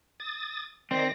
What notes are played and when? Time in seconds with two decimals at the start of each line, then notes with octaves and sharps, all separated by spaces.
0.20 D#6 A6
0.91 D#3 C4 D5 A#6